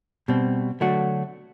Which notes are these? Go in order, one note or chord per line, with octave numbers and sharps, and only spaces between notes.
B2 G3 C4
D3 F#3 A3 D4 F#4